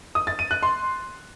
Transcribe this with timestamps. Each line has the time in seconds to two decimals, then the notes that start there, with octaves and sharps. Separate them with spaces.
0.15 D#6
0.27 A6
0.39 D#7
0.51 F#6
0.63 C6